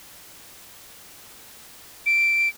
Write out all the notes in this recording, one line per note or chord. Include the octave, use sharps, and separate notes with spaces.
D7